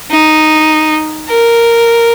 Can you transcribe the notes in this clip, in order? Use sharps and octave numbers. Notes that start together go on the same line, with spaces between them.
D#4
A#4